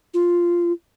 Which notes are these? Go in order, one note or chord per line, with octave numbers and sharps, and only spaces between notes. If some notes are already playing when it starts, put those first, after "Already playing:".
F4